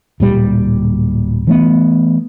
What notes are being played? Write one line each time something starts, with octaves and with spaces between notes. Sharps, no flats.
D1 A#2 G3
E3 A3 B3